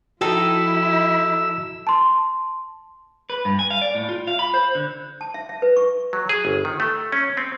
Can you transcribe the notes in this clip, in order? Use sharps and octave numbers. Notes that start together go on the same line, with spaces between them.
F3 D#4 E4 F#4 A4 G5 E6
A5 C6
B4
G2
G#5
F5
D5
A2
F4
F5
B5
C5
D3
A5
E5
E5
B4
C#6
F#3
G#4
G1
D#3
A3
C#4
C4